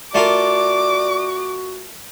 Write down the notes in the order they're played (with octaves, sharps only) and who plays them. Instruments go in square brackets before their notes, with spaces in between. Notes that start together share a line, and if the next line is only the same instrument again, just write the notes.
[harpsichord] A3 F4 A#4 [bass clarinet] F#4 [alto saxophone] D5 [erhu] D6